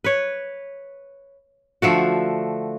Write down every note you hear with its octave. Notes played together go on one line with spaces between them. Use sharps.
B4 C#5
D3 F3 A3 F#4